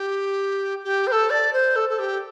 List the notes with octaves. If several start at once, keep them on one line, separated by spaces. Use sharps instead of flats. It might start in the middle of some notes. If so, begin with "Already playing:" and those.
Already playing: G4
G4
C5
A4
D5
C5
A4
A4
G4